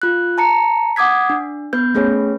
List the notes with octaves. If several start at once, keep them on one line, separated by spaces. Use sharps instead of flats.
F4 F#6
A5 A#5 C#7
F#5 D6 D#6 G#6 B6
D4
B3 B4 G6
A3 C#4 G#4 B4 C#5